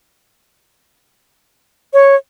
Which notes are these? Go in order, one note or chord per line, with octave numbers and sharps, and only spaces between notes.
C#5